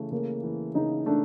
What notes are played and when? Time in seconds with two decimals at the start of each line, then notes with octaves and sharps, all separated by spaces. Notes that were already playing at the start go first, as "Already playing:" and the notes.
Already playing: C#3 E3 A3
0.12 C#3 A#3
0.43 E3
0.75 C#3 D#4
1.06 A3 D4